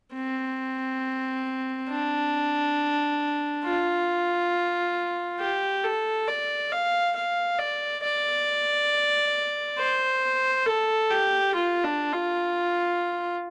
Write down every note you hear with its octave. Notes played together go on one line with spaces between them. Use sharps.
C4
D4
F4
G4
A4
D5
F5
F5
D5
D5
C5
A4
G4
F4
D4
F4